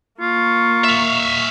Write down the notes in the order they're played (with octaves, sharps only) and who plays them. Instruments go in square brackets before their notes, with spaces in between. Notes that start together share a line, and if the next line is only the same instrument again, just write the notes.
[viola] A#3 C#6 [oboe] F4
[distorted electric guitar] E5 F5